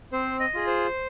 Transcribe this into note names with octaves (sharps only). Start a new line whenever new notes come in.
C4 C5
D#5
F4 G#4
C5